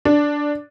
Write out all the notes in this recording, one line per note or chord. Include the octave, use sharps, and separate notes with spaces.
D4